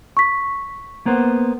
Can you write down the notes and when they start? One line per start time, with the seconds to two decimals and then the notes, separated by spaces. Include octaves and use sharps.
0.17 C#6 B6
1.06 A#3 B3 C5